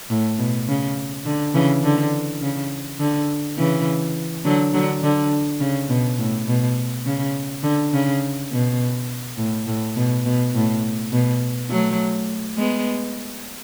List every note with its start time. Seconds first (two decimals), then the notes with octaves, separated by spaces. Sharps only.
0.10 A2
0.39 B2
0.68 C#3
1.26 D3
1.54 C#3 E3
1.83 D3
2.41 C#3
3.00 D3
3.57 C#3 E3
4.45 D3 F#3
4.73 D3 F#3
5.03 D3
5.60 C#3
5.89 B2
6.18 A2
6.47 B2
7.06 C#3
7.63 D3
7.93 C#3
8.51 B2
9.38 A2
9.67 A2
9.96 B2
10.25 B2
10.55 A2
11.12 B2
11.70 F#3 A3
12.57 G#3 B3